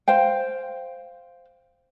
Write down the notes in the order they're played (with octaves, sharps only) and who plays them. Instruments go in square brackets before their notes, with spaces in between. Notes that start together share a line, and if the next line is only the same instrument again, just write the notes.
[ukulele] C5 F5 G5